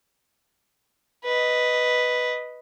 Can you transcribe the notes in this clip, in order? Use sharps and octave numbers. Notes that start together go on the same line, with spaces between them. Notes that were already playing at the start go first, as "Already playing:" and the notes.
B4 D#5